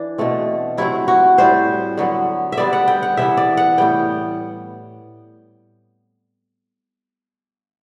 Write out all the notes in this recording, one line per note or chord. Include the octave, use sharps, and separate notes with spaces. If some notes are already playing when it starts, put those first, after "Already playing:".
Already playing: E3 D4
B2 A3 C4
C3 F#3 A3 C4 E4
F#4
A2 G3 C4 C5
D3 F#3 B3
E5
D3 G3 B3 D5
F#5
G5
F#5
C3 E3 B3 E5
D5
F#5
A2 G3 B3 G5